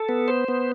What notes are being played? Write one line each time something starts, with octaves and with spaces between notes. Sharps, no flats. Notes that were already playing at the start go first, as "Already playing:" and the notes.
Already playing: A4
B3
C5
B3